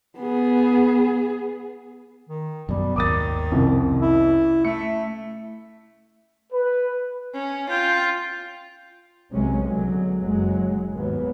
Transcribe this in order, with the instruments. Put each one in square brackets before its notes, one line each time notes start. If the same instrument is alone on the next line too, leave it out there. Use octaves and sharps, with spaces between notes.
[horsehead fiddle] B3 G#4
[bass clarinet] D#3
[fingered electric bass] F#2 B2 [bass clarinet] G3
[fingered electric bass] G#1 D#2 [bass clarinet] D#3 [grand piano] D6 D#6 A6
[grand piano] C2 F2 [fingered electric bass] C#4
[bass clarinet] E4
[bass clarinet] A3 [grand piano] C#7
[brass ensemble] B4
[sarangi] C#4
[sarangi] F4 [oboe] G5
[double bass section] B1 C3 F#3 G#3 C#4
B1 D3 F#3 G#3
F#1 F#2 F#3 G#3
D#2 G#2 F#3 B3